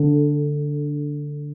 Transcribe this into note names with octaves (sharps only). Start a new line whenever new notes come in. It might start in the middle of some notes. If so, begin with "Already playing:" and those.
Already playing: D3